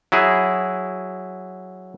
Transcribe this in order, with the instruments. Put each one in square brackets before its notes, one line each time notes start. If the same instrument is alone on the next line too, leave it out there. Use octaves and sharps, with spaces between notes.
[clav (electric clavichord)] F#3 E4 G#4